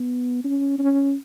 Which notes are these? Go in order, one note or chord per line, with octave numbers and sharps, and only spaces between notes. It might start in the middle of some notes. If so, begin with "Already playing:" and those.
Already playing: B3
C#4
C#4